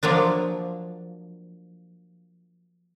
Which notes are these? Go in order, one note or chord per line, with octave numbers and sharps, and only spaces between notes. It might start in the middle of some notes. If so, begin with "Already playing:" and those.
F3 F#3 A#3 D4